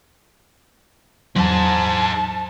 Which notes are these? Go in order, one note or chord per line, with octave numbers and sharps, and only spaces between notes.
E2 E3 F#3 G#4 C5 A5